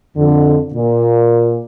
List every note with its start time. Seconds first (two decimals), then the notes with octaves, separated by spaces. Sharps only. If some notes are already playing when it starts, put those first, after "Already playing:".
0.16 F2 D3
0.74 A#2